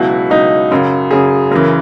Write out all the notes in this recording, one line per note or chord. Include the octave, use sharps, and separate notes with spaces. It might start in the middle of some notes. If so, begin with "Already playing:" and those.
Already playing: C#2 B2 F#3 E4
C#2 B2 F#3 D#4
F#2 C#3 F#3
F#2 C#3 F#3 G#4
F#2 C#3 E3 A#4